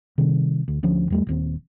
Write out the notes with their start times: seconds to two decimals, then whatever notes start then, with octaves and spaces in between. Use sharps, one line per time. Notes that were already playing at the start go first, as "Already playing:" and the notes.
0.18 C3 D#3 G3
0.68 D2
0.83 D2 D3 F3 C#4
1.10 E2 G3 A3
1.27 D#1 D#2 C4